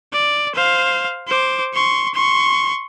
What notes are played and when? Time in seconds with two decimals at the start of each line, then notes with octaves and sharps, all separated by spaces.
0.13 D5
0.55 C5 F5
1.28 C5 D6
1.74 C6 C#6
2.14 C6 C#6